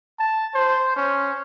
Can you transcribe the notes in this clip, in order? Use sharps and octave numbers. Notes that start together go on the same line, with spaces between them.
A5
C5
C#4